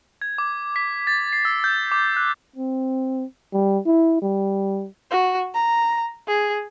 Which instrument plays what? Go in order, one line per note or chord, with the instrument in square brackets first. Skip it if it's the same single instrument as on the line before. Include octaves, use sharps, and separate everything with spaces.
[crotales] G#6
D6
B6
A6
C7
E6
G6
D6
F#6
[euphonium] C4
G3
E4
G3
[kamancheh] F#4
A#5
G#4